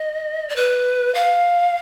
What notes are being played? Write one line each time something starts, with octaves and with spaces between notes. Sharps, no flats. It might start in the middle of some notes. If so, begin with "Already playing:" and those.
Already playing: D#5
D5
B4
F5